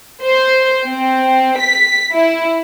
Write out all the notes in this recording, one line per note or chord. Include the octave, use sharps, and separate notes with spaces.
C5
C4
B6
E4